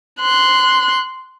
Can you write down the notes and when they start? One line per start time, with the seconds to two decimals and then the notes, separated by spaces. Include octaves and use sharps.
0.20 C6 F#6